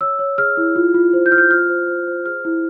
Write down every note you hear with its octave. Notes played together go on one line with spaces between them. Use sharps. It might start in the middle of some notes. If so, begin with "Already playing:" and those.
C#5 E6
C#5
G#4 F6
E4
F4
F4
C5
G6
F4 F6
G6
F4 F6
C5
C5
C5
G#4 F6
E4